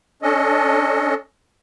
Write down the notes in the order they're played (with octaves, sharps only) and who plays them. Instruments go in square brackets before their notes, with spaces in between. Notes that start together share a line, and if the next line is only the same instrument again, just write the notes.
[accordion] C#4 D4 A4 D#5